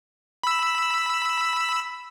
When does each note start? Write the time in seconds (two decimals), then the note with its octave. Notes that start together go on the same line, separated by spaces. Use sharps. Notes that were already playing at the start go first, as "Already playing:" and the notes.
0.43 B5 E6